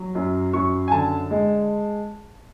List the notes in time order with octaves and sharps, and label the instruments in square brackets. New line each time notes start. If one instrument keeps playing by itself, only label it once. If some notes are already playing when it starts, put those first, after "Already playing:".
Already playing: [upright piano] F#3
F#2
F#2 C#6
G#5
D3 A5
G#3